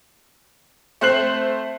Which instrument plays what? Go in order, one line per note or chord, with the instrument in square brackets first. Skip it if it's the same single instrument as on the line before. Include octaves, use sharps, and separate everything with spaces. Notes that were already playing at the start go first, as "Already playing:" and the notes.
[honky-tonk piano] A3 C4 C5 F#6 C7 F#7